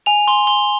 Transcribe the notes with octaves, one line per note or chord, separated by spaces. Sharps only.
G#5 F7
C6 G7
C6 G7